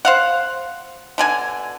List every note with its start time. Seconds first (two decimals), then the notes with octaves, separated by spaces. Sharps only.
0.05 C5 F5 F#5
1.18 B2 D3 G#5